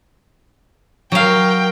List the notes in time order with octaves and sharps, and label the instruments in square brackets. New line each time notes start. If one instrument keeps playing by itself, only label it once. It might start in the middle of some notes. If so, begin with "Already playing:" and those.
[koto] F#3 F5 [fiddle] A#4 G5